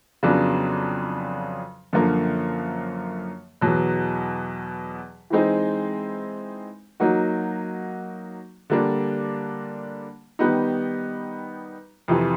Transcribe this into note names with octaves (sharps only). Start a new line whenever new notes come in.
F2 C#3 F#3 B3 D4
F#2 D3 F3 A#3
E2 B2 F#3
E3 G#3 C4 D#4
F#3 A#3 D#4 F#4
D3 G3 A#3 D4
D#3 G3 B3 D#4
F2 C3 E3